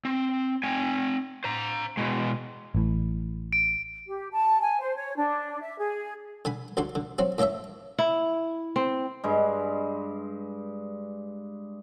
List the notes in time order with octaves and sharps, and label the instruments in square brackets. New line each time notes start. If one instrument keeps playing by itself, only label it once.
[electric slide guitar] C4
C4 G5 G#5
C5 A#5
B2 G#3
[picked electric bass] A1 A2
[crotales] D7
[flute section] G4
A5
G#5
C5
C#5
D4
E5
G#4
[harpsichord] D3 G#5 B5
D2 D3 F#4 C6
D3
F#3 C4 F#4
A2 A#3 A4 C#5 E5
[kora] E4
C4
[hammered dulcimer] G2 G#3